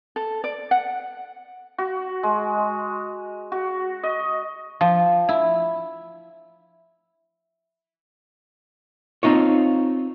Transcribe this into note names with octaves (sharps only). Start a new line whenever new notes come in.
A4
D5
F#5
F#4
G#3
F#4
D#5
F3
E4
C4 D#4 F4 C#5